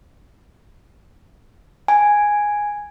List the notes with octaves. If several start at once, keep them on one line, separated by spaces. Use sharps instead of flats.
G#5